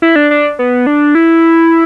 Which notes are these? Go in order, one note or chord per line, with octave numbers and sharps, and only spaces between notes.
E4
D4
D4
B3
D4
E4